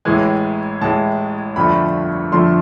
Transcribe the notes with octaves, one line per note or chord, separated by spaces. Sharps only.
A1 A2 E3 G#3 G#5
A1 A2 E3 G#3 A5
G1 F2 D3 F3 A3 B5
G1 F2 D3 F3 A3 C6